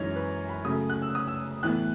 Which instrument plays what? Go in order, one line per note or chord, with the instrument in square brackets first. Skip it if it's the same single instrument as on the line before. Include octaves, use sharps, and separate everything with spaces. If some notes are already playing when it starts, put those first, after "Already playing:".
Already playing: [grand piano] F#2 E3 G#3 D#4 C#5
B4
B5
C#3 F#3 A3 D#6
F#6
E6
D#6
E6
A2 E3 B3 F#6